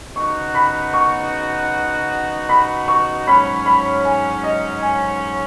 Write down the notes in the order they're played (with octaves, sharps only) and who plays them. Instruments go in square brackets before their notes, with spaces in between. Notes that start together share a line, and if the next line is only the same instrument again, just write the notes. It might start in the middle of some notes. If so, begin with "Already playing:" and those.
[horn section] C#3 B3 D#4 F#4 [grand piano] C#6
[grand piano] B5
C#6
B5
C#6
[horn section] G#2 F#3 C#4 [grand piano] B5
[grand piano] B5
G#5
D#5
G#5